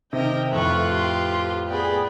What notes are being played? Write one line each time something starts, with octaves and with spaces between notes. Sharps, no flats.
C3 D#3 A#4 D#5 E5 G5
F2 A2 F4 B4 C#6 F#6
G4 C6
B3 G#4 D5 G5 B5